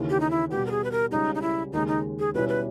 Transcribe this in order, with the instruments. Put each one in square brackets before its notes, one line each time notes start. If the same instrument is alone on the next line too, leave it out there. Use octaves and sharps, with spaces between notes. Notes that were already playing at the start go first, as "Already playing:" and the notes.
Already playing: [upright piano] D#2 C#3 E3
[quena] G4
D#4
E4
[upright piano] B2 G3 B3 [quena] G4
[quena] A#4
G#4
B4
A#4
[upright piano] C#2 C#3 G3 [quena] D#4
[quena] D#4
E4
[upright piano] D#2 C#3 G#3 [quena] D#4
[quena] D#4
G#4
[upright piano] B2 G3 C#4 E4 [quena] B4
[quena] B4